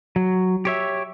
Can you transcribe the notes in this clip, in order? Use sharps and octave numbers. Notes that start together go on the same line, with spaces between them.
F#3
G4 C#5 E5